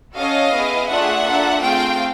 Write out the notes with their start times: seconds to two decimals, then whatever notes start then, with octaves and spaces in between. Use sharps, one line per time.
0.16 C#4 F#4 A4 D#5 F5
0.52 B3 E4 G#4
0.89 A3 D4 F4 G#4 E5 F#5
1.25 A#3 D4 F4 A4
1.61 A3 C4 F4 G#4 F5 G5